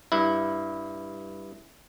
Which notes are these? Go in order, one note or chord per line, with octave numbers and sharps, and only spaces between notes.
G2 E4